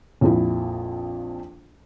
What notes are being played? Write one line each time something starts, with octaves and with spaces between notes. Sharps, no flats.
A#1 F2 E4